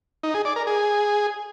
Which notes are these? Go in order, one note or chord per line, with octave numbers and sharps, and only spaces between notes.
D#4
G#4
D5
A#4
G#4